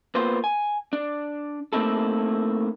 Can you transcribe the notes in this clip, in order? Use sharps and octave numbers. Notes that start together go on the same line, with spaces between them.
A#3 B3 F4 B4 C5
G#5
D4
A3 A#3 C4 D#4 E4 A4